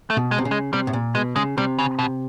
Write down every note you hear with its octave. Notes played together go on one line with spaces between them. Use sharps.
A3
B2
G#3
C3
C#3
G#3
C3 G3
A2
A#2
B2 G#3
C#3 G#3
C3 G3
C#3
B2